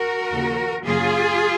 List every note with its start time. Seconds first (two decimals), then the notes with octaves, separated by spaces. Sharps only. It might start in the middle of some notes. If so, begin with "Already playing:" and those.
Already playing: F#4 A#4
0.32 D#2 C#3 F3 A#3
0.85 F#2 C#3 F#3 A#3 F4 G#4